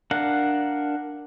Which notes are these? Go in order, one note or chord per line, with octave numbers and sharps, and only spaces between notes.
D4 A#4 F5 F#5